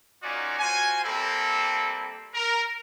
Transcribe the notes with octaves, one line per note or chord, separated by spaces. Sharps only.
A#3 C#4 D#4 F4 F#4 D5
F4 F#4 C5 G#5
G3 A#3 C4 E4 A4
A#4